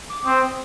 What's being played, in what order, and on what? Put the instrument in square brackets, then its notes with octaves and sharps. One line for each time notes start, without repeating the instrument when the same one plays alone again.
[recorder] D6
[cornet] C4 [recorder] D#6